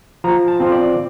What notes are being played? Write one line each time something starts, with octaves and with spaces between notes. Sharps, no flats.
F3 A#5
A5
C4 F4
D5